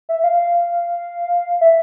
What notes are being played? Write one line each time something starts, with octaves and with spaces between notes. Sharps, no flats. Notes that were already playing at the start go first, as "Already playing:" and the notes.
E5
F5
E5